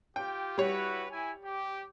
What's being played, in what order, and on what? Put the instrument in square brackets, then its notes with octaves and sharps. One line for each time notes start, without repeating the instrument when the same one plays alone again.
[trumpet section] F4 G4 [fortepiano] G5
[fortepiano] G3 C#5 [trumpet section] E4 F#4 B4
[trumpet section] E4 G#5
G4